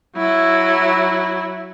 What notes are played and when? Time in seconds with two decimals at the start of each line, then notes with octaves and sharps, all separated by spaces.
0.16 F#3 E4